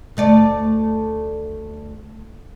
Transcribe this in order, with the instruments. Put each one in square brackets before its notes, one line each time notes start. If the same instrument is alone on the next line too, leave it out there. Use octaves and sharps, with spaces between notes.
[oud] D2 A3 D5